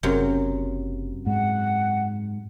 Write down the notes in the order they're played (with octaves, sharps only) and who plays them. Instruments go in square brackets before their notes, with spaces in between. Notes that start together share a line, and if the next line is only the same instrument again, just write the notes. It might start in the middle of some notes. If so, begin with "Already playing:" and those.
[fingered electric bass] F#1 [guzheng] F#2 C3 F#3
[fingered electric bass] G#2 [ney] F#5